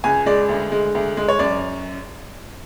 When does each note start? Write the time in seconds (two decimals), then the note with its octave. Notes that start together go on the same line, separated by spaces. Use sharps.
0.04 C#2 G#5
0.26 G#3 D5
0.49 D2
0.72 G#3
0.95 D2
1.17 G#3
1.28 C#5
1.39 F#2 D5